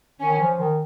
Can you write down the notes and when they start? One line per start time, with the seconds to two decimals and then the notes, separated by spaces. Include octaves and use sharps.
0.20 D#3 C#4
0.40 F3
0.59 D#3